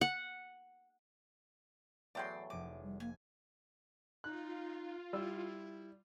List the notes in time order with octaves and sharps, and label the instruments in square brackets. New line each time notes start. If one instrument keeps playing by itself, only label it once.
[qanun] F#5
[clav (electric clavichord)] E2 A2 F#3 [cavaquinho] D5 G5 C6
[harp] F1 G#4 D#7 [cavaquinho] D6
[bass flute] G3
[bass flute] A#3 [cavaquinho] G#5
[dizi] D#4 [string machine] F4 [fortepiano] F#6
[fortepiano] G3 E6 [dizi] E4